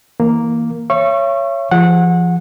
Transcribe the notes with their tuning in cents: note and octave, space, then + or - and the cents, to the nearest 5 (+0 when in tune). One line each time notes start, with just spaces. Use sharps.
E3 -20 A#3 +0
C#5 +0 E5 +45 C#6 -20
F3 -25 G#4 +0 F#5 -20